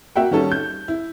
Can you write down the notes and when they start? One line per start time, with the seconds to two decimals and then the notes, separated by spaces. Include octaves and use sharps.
0.16 A#3 F#4 E5 F#5 G5
0.31 D#3 G3 C#4 D#4 A4
0.52 G6
0.88 E4